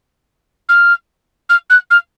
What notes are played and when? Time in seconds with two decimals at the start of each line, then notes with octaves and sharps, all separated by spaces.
0.69 F6
1.49 F6
1.70 F#6
1.91 F6